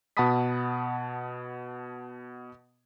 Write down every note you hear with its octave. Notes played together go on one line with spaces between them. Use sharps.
B2 F#5 A5 B5 D#6 B6